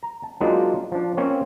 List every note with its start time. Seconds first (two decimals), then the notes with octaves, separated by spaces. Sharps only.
0.03 A#5
0.23 A5
0.41 F#3 G#3 A#3 D4 D#4 F4
0.92 F3 D4
1.17 A#3 C4 C#4 C#5